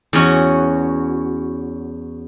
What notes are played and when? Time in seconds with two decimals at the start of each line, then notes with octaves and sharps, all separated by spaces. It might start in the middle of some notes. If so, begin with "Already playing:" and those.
0.13 E2 C#4 F#4